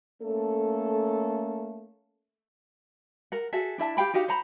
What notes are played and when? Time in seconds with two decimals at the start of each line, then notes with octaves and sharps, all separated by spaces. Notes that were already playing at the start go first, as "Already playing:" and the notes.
0.23 A3 A#3 C#4 A4
3.32 A#4 F#5
3.53 F#4 G#4 A4 E5
3.78 D4 E4 E5 A5
3.97 G4 F5 G5 B5
4.14 D#4 F#4 G4 F5
4.28 C5 F#5 A#5 B5